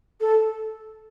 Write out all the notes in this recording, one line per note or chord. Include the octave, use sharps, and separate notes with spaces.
A4